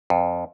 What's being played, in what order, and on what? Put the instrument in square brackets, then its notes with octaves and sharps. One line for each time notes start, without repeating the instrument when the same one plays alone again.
[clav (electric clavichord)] F2